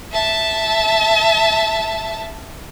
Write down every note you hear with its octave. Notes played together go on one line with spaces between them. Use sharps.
E5 A5